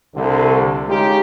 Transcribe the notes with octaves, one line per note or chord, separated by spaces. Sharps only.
C2 D3
G#3 C#4 D#4 F4 G4